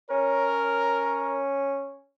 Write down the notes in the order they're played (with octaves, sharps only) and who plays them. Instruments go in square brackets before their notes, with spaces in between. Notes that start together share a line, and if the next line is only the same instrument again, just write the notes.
[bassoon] C#4 [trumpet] A#4 [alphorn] C#5